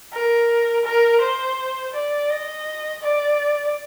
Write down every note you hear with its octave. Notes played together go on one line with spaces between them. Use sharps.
A#4
A#4
C5
D5
D#5
D5